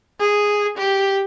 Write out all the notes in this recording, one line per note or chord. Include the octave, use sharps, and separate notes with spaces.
G#4
G4